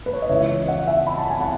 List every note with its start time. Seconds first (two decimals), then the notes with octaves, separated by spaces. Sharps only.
0.06 B4
0.13 C#5
0.22 D#5
0.30 C#2 C#3 E3 G#3 C#5 E5
0.68 D#5 F#5
0.87 E5 G#5
1.07 B5
1.18 A5
1.30 G#5
1.41 F#5 A5